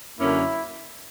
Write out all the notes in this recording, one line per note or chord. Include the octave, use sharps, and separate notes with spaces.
F#2 D3 A#3 C#4 E4